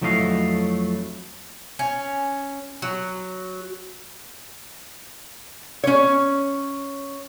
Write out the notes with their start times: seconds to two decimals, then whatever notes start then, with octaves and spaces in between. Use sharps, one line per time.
0.02 F2 F#3 A3 E4 D#5 F5
1.79 C#4
2.82 F#3
5.84 C#4 C#5